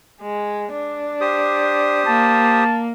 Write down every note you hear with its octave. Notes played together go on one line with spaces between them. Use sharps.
G#3
D4
G4 C5 D#6
A#3 A5